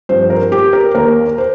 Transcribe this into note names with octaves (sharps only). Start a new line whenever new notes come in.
G2 F3 C4 C5
A#4
G4
A#4
D#2 D#3 A#3 A#4
C5